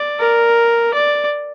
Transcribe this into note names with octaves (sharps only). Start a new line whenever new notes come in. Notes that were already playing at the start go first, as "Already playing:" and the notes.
Already playing: D5
A#4
D5